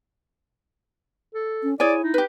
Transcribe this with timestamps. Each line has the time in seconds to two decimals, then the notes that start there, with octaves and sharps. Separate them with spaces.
1.35 A4
1.63 C#4
1.80 E4 G#4 C#5 D5 G#5
2.02 D#4
2.14 G4 B4